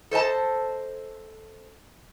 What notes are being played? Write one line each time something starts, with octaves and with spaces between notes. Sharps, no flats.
A4 C5 D#5 A5